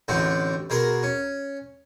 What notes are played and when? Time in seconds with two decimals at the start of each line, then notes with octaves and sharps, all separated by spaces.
0.08 A1 A2 D3 C4 F#4
0.70 B2 G#4 A#4 C6
1.03 C#4